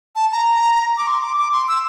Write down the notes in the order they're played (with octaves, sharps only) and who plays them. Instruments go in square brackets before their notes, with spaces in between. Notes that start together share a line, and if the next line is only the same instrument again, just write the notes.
[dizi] A5
A#5
D6
C6
D6
D6
C6
E6